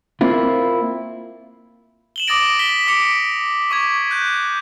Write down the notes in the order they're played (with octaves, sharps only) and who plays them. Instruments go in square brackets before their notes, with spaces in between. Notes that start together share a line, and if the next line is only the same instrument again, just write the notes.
[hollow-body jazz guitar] A#3 C4 E4 F4
[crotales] E7 F#7 G7
D6 D#6 A6 A#6 D7
B6 E7 G7
D6 B6 C#7 D7 F7
C#6 D6 G#6
F#6 G6